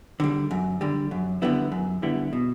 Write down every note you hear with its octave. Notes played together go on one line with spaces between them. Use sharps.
D3 G3
F#2
D3 G3
F#2
D3 G3 B3 E4
F#2
D3 G3 B3 E4
B2